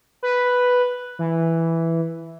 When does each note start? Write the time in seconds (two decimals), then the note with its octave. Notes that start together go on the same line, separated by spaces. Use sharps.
0.23 B4
1.19 E3